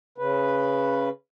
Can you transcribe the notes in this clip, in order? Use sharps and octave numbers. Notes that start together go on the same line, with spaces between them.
C#3 B4